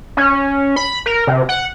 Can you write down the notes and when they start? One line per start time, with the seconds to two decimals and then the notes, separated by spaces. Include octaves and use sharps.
0.17 C#4
0.76 B5
1.06 A#4
1.27 C3
1.49 F#5